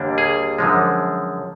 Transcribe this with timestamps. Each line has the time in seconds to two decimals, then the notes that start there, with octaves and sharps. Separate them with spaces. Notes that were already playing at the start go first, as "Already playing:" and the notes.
Already playing: D#2 D3 G3 A#3 D4
0.18 G#4
0.58 F#2 D3 F3 G#3